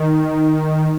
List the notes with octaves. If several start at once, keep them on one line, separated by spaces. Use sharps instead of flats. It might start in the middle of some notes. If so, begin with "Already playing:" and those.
Already playing: D#3